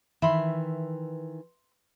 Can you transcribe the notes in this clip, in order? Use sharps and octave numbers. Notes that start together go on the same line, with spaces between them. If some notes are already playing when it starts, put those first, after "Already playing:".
D#3 E3 E5 B5 C6